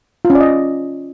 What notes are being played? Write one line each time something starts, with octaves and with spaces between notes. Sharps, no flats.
F4
C#4
D5
D#5